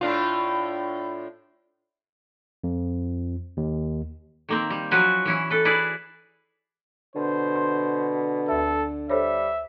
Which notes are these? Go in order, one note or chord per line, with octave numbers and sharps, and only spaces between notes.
A2 D4 F4
F2
D#2
D#3 A#3 C4
G3
F3 F#3 C#4 F#4 B4 G#5
E3 C#4 E4
A4 B4
E4 G#4 B4 D5
B2 D3 C5
C6
D2 A4 E5
G3 A4 C5 C#5 E5